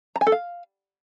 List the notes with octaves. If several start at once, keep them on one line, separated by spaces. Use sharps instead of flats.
A#5
G#5
A4
F5